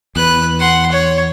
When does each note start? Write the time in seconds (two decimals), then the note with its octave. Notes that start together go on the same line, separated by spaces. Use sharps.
0.16 E2 B4 F#6
0.59 F#5 C6
0.92 C#5